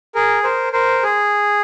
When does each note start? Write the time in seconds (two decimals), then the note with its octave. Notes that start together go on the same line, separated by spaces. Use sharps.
0.15 G#4 A#4
0.43 A#4 C5
0.73 A#4 C5
1.03 G#4